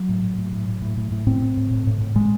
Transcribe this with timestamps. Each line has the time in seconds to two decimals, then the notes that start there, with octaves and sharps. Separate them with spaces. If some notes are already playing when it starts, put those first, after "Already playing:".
Already playing: F#3
0.09 A2
0.24 A2
0.38 A2
0.52 A2
0.68 A2
0.82 A2
0.97 A2
1.12 A2
1.27 A2 C4
1.42 A2
1.57 A2
1.71 A2
1.87 A2
2.01 A2
2.15 A2 G#3